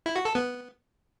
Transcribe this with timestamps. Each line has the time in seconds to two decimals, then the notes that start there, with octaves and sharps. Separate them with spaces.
0.06 E4
0.16 F#4
0.25 A4
0.35 B3